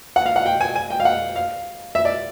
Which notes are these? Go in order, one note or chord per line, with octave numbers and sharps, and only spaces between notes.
F#5
F5
F#5
G5
G#5
G#5
G5
F5
F#5
F5
E5
D5